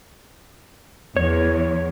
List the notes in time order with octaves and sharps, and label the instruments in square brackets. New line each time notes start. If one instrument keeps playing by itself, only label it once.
[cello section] E2 [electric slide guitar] C#5